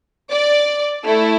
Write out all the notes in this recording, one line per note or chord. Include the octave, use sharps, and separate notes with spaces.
D5
A3 E4 A4